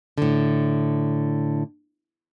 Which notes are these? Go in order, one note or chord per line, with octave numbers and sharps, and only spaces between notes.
A2 D3